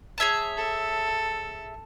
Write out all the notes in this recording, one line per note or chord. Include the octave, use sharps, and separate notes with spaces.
G#4 C#5 E5 A5
A4